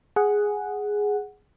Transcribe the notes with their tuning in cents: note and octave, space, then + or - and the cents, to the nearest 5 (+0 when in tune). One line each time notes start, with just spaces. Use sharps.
G#4 +0 F#5 +0